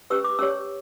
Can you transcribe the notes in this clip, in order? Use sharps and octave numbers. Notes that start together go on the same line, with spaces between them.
C#4 G4 B4 E6
D6
C#4 G4 C#5 E6